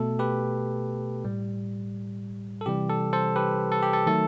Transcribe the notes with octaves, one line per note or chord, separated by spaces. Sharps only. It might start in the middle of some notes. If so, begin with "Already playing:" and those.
Already playing: B2 A3 A4
G4 B4
A2 G3
A4
C3 E3 G3 G4
A4
A4 C5
G4 B4
A4
G4
A4
D#3 F#3 A3 A4